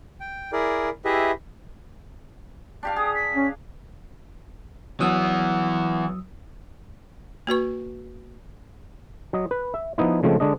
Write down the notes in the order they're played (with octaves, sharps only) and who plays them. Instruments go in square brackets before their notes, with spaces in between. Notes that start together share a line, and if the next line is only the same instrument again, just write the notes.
[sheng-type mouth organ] G5
E4 G#4 A#4 D5
E4 G4 G#4 B4 D#5 E5
[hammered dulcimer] D4 G4 F5
[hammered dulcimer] G#4 [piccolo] D#6
[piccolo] B6
[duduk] C#4
[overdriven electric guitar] E3 B3 [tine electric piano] F#3 D#6 E6
[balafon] A#3 F#4 B4 C#6
[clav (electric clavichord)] F#3 D#5
B4
E5
F3 B3 D#4 E4
C#3 F3 G#3 A3 C4
D3 G#3 D4 D#5